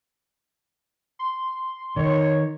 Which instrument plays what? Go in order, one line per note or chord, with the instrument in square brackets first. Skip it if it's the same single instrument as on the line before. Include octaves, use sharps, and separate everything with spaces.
[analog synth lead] C6
[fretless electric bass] D#3 [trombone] C#5